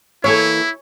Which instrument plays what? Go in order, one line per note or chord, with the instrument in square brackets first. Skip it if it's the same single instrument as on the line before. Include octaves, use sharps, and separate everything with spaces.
[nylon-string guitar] E3 A#3 A4 [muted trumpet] E4 [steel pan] C#5